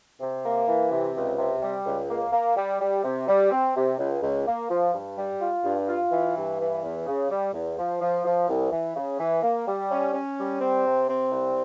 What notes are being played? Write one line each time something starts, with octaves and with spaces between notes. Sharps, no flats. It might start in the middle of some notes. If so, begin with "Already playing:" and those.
C3
A#3
E3
C3
C#2
C3
G3
C#2
A#3
A#3
G3
G3
C3
G3
C4
C3
C#2
C#2
A#3
F3
G2
G3
F4
G2
F4
E3
G2
E3
E2
C#3
G3
E2
F3
F3
F3
C2
E3
C#3
E3
A#3
G3
C#4
C#4
G3
C4
C3
C4
C2